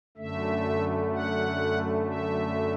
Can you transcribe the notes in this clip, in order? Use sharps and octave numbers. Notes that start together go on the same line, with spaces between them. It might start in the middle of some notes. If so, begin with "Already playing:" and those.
F#2 D3 A3 E5
F#5
E5